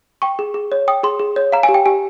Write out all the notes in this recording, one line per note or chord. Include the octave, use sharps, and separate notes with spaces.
G5 C#6
G#4
G#4
C#5
G5 D#6
G#4 C6
G#4
C#5
F5 A#5
G#5
G4
G5
G4 G#5